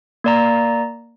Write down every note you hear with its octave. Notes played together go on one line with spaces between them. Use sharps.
A#3 D5 A#5